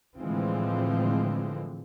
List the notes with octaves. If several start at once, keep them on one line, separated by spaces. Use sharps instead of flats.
A2 D3 E3 F3 G#3 C4